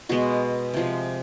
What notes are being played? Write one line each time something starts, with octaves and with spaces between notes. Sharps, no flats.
B2 G#3 B3 F#4
C3 F3 G#3